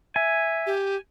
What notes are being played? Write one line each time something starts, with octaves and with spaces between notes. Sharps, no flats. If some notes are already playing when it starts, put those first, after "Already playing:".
E5 G#5
G4